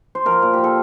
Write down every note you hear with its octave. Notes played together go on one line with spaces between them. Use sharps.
C5
F3 A#4
A#2
A#2 G4
A4